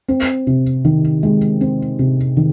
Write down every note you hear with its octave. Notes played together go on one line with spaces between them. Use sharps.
C4
C3
D#3
G#3
C4
C3
D#3